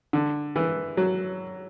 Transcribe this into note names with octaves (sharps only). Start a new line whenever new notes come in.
D3
E3
F#3